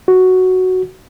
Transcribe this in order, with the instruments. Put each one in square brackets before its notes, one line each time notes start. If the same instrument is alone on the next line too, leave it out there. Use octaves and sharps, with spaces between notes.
[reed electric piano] F#4